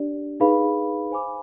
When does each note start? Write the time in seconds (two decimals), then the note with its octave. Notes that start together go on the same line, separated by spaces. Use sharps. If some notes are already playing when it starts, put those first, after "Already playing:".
Already playing: D4 G4 D5
0.40 D#4 G#4 B4 F5 B5
1.11 C5 F5 G#5 B5 D6